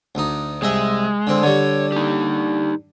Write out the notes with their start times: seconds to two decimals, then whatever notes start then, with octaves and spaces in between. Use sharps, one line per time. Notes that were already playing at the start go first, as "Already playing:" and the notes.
0.15 D2 D#4
0.62 C2 G#3 D#5 E5
1.27 D3 C4
1.43 D3 G3 C#5
1.92 D#4 G4